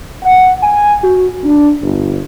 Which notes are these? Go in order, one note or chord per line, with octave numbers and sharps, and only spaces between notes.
F#5
G#5
F#4
D4
G1